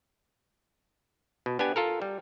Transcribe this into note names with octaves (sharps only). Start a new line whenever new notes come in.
B2
B3 D4 G4 F#5 G#5
F4 A4 A#4
G3